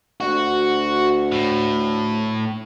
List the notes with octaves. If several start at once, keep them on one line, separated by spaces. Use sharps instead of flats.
D2 F#4
A2